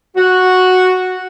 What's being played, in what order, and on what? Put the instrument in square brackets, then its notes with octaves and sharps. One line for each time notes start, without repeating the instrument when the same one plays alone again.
[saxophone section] F#4